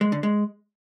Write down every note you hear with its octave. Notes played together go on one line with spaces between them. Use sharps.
G#3
D3
G#3